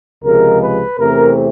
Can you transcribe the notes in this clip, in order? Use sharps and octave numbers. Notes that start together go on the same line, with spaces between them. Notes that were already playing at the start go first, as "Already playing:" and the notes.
C#2 C3 F3 G#3 A#4
B4
E2 C3 E3 A3 C4 A#4